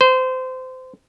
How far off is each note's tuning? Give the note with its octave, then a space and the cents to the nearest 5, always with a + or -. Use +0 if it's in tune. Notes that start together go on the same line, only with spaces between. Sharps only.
C5 -25